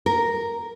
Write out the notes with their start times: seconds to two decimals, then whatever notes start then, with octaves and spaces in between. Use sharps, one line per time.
0.06 A#4